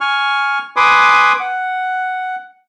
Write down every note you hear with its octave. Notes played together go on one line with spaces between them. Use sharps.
G#5 C#6 F6
B4 G#5 B5 C6 D6 D#6
F#5